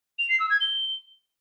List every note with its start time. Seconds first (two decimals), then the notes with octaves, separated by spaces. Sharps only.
0.19 F7
0.29 C7
0.40 E6
0.50 G#6
0.61 G7